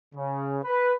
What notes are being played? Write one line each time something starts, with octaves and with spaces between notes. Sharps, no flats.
C#3
B4